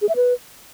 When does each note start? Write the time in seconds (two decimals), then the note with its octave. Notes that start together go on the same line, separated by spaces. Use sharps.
0.02 G#4
0.09 E5
0.16 B4